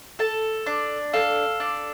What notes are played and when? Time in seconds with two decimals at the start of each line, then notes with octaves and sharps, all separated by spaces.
0.19 A4 A5
0.66 D4
1.13 A4 F5
1.60 D4